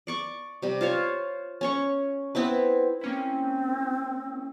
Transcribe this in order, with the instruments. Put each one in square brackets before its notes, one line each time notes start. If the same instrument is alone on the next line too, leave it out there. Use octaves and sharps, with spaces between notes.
[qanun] D5 C#6 D6
C3 G3
F4 C5 C#5
C#4 C#5 C#6
B3 C4 E4 B4
[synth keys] A#3 C#4 E4 [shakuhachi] C4